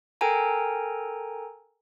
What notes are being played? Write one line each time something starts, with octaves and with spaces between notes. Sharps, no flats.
A4 A#4 G5 G#5 A#5